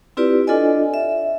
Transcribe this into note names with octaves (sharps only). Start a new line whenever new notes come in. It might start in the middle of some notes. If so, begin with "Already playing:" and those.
C4 E4 F4 G4 B4 D5
D4 F4 A4 D5 D#5 G#5
E5